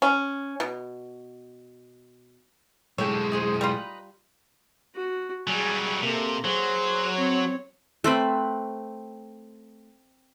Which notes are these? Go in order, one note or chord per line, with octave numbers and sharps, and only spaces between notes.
C#4
B2
B1 G#3 D#4 G4 A4 C#5
D#4 G#4 C5
G3 D#4 F4 B4 A#5
F#4
F#3 G3 G#4 G#5
C3 A#3 A4
F#3 G#4 C5
C4 C#5
A3 C4 B4